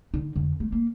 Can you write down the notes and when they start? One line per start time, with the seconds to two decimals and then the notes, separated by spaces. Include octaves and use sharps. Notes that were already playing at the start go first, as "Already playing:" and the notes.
0.14 D3 D#4
0.36 F2 D3
0.60 A3
0.72 A#3